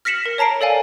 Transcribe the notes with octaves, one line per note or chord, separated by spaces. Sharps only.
F6 A#6 B6 C#7 E7 F#7
A#4
C#5 A5 A#5 C7 D7
A4 D5 F5 G#5